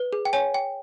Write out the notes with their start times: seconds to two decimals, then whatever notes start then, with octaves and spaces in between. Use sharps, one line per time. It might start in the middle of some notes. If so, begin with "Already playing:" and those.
Already playing: B4
0.13 G#4
0.25 G5
0.33 C#5 G#5
0.54 G5